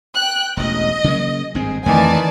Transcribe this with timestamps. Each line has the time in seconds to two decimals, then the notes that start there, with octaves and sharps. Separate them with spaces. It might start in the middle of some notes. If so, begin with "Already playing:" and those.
0.13 G5 F#6
0.57 E1 A1 D#5
1.04 C#3 F#3 A#3
1.55 G#1 G2 C4 G#4
1.86 F2 D#3 E3 A3 C4 D5 G#5 A5